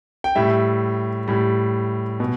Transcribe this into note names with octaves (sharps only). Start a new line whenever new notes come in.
G5
A2 G3 E5
A2 G3
B2